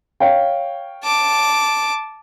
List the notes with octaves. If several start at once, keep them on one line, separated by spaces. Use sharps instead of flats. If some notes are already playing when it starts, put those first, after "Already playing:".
C#5 F5 G5
A5 D6